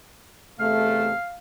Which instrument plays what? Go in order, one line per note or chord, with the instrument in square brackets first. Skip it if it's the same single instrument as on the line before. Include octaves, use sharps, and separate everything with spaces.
[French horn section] E2 C3 A3 [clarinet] F5